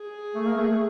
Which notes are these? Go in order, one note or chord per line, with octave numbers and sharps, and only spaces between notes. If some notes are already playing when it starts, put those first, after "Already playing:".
Already playing: G#4
A3
A#3
A3
A3